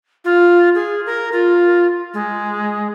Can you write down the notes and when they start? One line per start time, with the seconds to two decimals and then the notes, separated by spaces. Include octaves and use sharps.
0.25 F4
0.75 G#4
1.06 A#4
1.32 F4
2.14 G#3